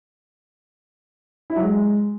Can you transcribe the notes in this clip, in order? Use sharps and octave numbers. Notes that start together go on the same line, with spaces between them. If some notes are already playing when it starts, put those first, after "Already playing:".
E4
F#3
G#3